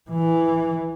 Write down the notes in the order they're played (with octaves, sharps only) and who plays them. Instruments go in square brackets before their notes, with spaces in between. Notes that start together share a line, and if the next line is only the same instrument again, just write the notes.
[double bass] E3